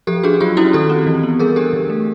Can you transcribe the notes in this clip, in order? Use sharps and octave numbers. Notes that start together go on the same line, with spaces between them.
F3 G4 A4
D4 F#4 G#4
F#3 F4 G4
C#4 E4 F#4
D#3 G4 A4
C4
E3
B3
G3 G#4 A#4
D4 G4 A4
D3
A3